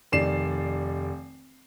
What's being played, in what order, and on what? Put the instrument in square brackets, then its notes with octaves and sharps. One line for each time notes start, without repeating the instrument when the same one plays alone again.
[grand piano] F1 D#3 D5 C7 E7